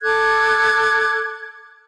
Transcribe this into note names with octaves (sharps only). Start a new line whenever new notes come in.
A4 D6 F#6 G#6